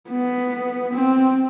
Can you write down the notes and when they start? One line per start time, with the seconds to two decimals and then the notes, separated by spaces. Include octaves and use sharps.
0.10 B3
0.93 C4